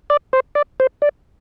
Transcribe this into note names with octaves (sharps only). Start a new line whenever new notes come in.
D5
C5
D5
C5
D5